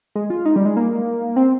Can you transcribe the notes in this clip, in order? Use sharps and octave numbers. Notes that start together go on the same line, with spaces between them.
G#3
F4
D#4
G3
G#3
A#3
C4